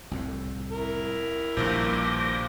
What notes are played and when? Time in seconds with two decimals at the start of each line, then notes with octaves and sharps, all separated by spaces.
0.11 C2 F2 A2
0.72 E4 A#4
1.57 A#1 G2 A#2 D#3 F3 D6 G6 A#6